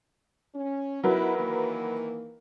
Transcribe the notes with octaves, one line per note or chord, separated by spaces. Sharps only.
C#4
F#3 B3 D#4 E4 A#4 B4
D#3 E3 A#3